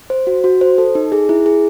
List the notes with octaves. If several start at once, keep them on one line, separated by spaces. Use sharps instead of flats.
C5
F#4
F#4
C5
A4
D#4
G#4
E4
G#4